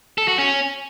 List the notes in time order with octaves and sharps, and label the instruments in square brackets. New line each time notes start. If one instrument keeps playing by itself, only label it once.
[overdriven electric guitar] A4
F#4
C#4